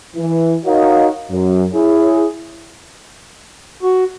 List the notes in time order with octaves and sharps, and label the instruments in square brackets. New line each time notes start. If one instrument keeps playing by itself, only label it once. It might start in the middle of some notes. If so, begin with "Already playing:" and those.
[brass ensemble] E3
D#4 F#4 A#4 C#5 D#5 F5
F#2
E4 G#4 C#5
[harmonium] F#4